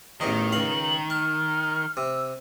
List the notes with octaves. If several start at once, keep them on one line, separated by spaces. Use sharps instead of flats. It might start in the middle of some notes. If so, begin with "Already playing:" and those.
A1 E2 D#3 D#4
C#2 F5 F#7
A5 F6
C3 E6